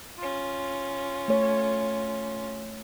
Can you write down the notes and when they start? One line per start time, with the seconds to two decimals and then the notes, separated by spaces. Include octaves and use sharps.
0.18 C#4 F4
1.28 A3 C#5